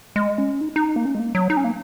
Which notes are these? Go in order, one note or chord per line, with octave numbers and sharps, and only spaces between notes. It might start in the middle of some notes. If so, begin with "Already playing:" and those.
G#3
C#4
D#4
D#4
A#3
C#4
G#3
A#3
F#3
D#4
C#4
A#3